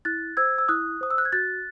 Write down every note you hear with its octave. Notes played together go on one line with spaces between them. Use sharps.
E4 F#6 A6
C5 E6 G#6
E6
E4 D#6 F#6
C5 D#6
E6
F#6
G#6
F#4 F#6 A6